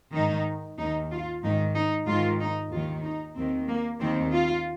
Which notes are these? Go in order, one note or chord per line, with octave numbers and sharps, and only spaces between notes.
G#2 D#3 D#4
D#2 D#3 D#4
F4
G#2 D#3 D#4
D#4
G#2 D#3 F4
D#4
D#2 D#3 F4
D#4
D#2 D#3 C4
A#3
D#2 D#3 C4
F4